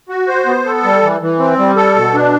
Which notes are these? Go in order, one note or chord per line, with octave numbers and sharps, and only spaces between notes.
F#4
C5
B3
A4
G3
E3
E3
C4
G3
A4
B2
D4